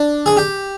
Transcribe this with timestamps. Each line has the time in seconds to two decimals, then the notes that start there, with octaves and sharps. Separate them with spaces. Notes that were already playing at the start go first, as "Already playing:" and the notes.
Already playing: D4
0.26 G#4
0.37 G4